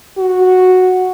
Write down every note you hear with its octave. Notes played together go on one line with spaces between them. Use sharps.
F#4